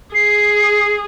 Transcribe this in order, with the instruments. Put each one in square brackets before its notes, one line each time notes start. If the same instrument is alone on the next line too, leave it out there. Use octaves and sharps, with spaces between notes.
[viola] G#4 [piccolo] C7